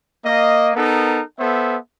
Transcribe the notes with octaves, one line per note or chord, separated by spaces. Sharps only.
A#3 D#5
B3 D#4 A4 A#4
B3 A4 C5 E5